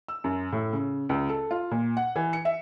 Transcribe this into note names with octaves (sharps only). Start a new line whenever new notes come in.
E6
F#2
A2
C#3
C#2
A4
F4
A#2
F#5
E3
C#7
E5